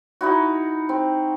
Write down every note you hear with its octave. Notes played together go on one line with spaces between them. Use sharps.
D#4 E4 F#4
C4